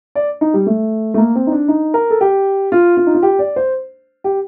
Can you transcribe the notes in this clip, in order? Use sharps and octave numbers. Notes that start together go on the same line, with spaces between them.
D5
D#4
G3
A3
A3
A#3
C4
D#4
D4
D#4
A#4
A4
G4
F4
F4
D#4
F4
G4
D5
C5
G4